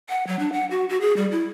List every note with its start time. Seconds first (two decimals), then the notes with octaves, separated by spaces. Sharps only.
0.09 F#5
0.27 F#3
0.39 D4
0.53 F#5
0.71 F#4
0.89 F#4
1.01 G#4
1.17 G3
1.32 E4